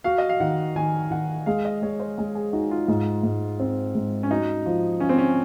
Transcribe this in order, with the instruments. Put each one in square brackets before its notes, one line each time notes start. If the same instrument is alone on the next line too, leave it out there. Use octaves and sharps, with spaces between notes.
[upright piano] F#4 [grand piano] F5
[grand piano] D#5
F5
[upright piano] D#3 [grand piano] F#5
[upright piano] D#3 [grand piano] G#5
[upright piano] D#3 [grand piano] F#5
[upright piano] G#3 [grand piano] F5
[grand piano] D#5
[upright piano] G#3 [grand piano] C#5
[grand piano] C5
[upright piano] G#3 [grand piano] G#4
[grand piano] G#4
[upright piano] D#4 [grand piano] F#4
[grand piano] F4
[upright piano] G#2
G#2
C4
G#2
[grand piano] C#4
[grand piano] D#4 [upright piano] F#4
[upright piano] F3
[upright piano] F3 [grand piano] C#4
[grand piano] C4
C#4